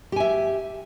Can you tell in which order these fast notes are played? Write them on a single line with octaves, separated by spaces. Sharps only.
G4 G#5 E5